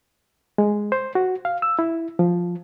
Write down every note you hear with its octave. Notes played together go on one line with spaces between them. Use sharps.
G#3
C5
F#4
F5
E6
E4
F3